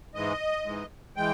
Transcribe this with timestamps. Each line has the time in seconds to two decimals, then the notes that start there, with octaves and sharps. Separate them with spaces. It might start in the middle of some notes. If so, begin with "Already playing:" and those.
0.15 G#2 E3 G#3 D#5
0.66 G#2 E3 G#3
1.16 E3 G#3 G5